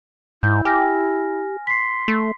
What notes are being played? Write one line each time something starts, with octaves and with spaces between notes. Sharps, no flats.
G#2 E4 G6
G4 G#5 F6 A#6
C6 B6 C7
A3